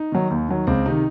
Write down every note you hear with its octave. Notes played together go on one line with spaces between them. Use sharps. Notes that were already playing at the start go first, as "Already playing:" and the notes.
Already playing: D#4
D#3 F#3
D#2
D#3 F#3
C#2 C4
C3 D#3 D#4